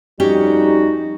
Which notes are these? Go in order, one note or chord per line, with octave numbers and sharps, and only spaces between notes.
F2 G3 C#4 D#4 F#4 G4